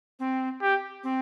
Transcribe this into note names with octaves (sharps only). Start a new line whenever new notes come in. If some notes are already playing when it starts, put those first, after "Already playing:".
C4
G4
C4